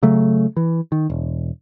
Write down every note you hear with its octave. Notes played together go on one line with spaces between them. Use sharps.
C#3 F#3 A3
E3
D#3
E1